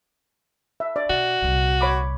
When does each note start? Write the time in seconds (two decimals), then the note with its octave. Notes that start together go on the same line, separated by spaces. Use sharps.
0.80 E5
0.96 D5
1.09 B2 F#4
1.42 C2 A#2
1.81 C#5 B5 D6